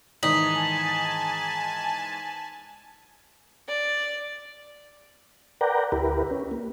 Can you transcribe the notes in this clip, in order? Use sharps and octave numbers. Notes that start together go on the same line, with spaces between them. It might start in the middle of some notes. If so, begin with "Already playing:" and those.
G#2 D#3 E3 D#4 G#5 A5 B6 F#7
D5
A#4 B4 D5 F#5 G5 A#5
D2 E4 G4 A#4 B4
C#4
A#3